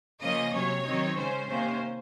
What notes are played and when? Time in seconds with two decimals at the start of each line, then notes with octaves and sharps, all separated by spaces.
0.22 C#3 F3 A#3 C#4 D#5
0.54 C3 F#3 C#4 C#5
0.85 D#3 F#3 C4 D#4
1.17 C#3 G#3 C#4 C5
1.49 C3 D#3 A#3 C#4 C5